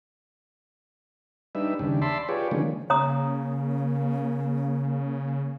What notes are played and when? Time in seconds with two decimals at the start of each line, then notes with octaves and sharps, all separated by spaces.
1.55 G3 D4 D#4 B4 E5
1.79 D#2 C#3 G3 D4
2.02 D5 E5 A5 B5 C6
2.29 F4 G4 G#4 B4 C#5 D5
2.51 D3 D#3 F3 G#3 A#3 C#4
2.90 C#3 A#3 C#5 A#5 D#6